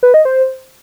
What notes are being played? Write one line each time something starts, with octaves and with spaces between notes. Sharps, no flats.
B4
D#5
C5